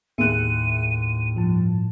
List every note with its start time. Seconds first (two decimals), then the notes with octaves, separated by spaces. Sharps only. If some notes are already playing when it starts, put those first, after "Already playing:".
0.18 D#2 A2 G#4 E5 F#6 C#7 D#7
1.35 G2 F3 A5